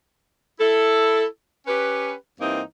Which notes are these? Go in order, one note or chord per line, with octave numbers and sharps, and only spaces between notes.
E4 A4
C#4 G4 B4
G2 E3 A#3 C4 D#4